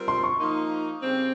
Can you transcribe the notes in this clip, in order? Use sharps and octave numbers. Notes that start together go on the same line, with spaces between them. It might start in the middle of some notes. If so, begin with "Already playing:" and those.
Already playing: G3 C4 F4 A#4
C6
C#6
F3 A#3 D#4
C#3 G3 C4